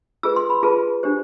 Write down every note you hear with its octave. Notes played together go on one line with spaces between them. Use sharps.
F4 G#4 B4 E6
C6
B5
F4 G#4 B4 A5
D4 G4 C5